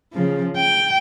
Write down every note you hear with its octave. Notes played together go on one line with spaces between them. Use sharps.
C#3 F3
G5